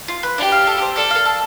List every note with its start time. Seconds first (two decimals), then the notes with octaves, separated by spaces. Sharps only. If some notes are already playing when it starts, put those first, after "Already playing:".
0.08 F4
0.23 B4
0.38 D4 G4
0.52 F5
0.67 A4
0.82 C5
0.96 D4 A4
1.11 F5
1.25 A4